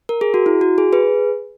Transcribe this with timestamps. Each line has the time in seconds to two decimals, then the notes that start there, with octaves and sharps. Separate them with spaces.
0.09 A#4
0.21 G#4
0.34 F#4
0.46 E4
0.61 F#4
0.78 G#4
0.93 G#4 B4